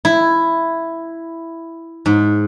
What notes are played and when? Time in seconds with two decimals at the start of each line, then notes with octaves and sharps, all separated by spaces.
0.05 E4
2.06 G#2